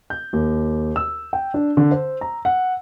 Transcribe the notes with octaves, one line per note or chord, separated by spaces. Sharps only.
G6
D#2
E6
G5
D4
D3
C5
A#5
F#5